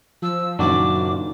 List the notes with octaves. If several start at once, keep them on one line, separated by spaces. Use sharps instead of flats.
F3 E6
F#1 F#2 A#2 D#3 D4 F#4 D6